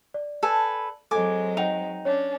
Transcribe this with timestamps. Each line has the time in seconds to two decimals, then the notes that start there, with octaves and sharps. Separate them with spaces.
0.14 D5
0.43 A4 B4 G#5
1.11 F#3 G#3 C4 A4 G#5 D6
1.57 D#4 F#5 G5 F7
2.05 C#4 D4 C#5